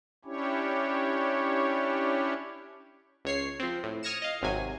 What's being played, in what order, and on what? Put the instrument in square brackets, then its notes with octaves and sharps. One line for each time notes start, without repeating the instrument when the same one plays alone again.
[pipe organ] C#4 D4 E4 G4 C#5
[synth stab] C#2 C#5 C7
F3 C4
A2
D#6 F6 G#6 A#6 C#7 E7
D#5 F5
G#1 C3 F#3 G#5